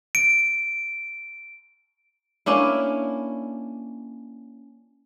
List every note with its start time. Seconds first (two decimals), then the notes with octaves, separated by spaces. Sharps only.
0.15 D7
2.46 A#3 C#4 D4 E4